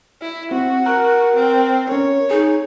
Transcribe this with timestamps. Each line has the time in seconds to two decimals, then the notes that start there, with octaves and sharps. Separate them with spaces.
0.21 E4
0.51 C4 F#4
0.86 A#4 A#5 F#6
1.36 C4
1.89 C#4 A#4 C#5
2.31 D#4 G#4